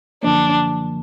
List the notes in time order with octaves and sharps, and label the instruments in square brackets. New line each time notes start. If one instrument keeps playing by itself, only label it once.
[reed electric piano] F#2 D3 F3 A#3 [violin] D4